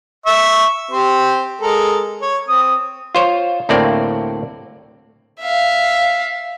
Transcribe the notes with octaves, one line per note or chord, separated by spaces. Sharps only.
E5 C#6
C4 G4 C5
G#3 A4 A#4
C#5
C4 D#6
F4 C5 C#5
D2 A2 A3 A#3 C4 D5
E5 F5